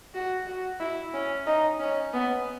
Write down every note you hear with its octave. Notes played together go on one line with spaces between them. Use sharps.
F#4
F#4
E4
C#4
D#4
C#4
B3